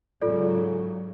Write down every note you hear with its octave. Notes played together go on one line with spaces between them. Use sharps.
G#2 C#3 F#3 F4 A4 D5